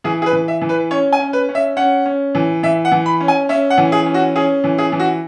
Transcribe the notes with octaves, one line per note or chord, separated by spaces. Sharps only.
E3 G#4
G#4
B4
E3
E5
E3
B4
C#4 C#5
G#5
C#4
B4
C#4
E5
C#4 F#5
C#4
E3
E3 E5
F#5
E3
B5
C#4
G#5
C#4 E5
F#5
E3
G#4
C#4
F#4
C#4 G#4
E3
G#4
E3
F#4